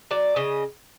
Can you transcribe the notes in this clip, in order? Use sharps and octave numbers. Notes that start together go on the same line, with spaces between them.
F#3 D5
C#3 D#5